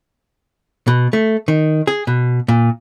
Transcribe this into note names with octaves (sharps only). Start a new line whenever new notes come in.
B2
A3
D#3
G#4
B2
A#2